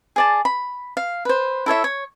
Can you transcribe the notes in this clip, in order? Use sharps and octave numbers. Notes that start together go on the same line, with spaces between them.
G#4 D5 A5
B5
F5
B4 C5
E4 A4 C#5 E5
C#5